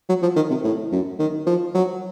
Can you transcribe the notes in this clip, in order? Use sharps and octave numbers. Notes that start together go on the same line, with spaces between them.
F#3
F3
D#3
C3
A2
F#2
D#3
F3
F#3